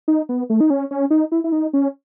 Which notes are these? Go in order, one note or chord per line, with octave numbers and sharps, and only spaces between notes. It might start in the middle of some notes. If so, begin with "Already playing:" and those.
D#4
B3
A3
D#4
C#4
C#4
D#4
E4
E4
D#4
C#4